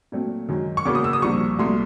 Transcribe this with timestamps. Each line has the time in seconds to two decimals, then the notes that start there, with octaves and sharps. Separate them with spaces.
0.12 A#2 F#3 A3 C4
0.49 F#2 D#3 G#3
0.77 C#6
0.85 E2 C#3 F#3 A#3 D6
0.95 D#6
1.04 E6
1.13 D#6
1.22 C2 A#2 F3 C#6
1.59 C2 A#2 F#3 A3 C6